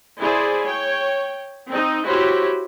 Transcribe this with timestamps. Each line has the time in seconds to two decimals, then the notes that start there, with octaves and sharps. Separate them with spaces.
0.20 E4 G#4 C5 D5
0.62 C#5 G5
1.68 C4 D#4
2.05 E4 F#4 G4 C5 C#5